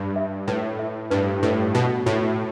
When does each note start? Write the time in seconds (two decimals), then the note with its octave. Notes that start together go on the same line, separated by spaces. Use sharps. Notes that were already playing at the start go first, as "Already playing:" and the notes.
Already playing: G2 B5
0.16 E5
0.48 A2 B4
0.79 E5
1.10 G2 B4
1.42 A2 B4
1.74 B2 A5
2.06 A2 F#4